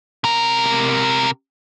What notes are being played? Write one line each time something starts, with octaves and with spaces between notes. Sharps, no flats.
C3 A#4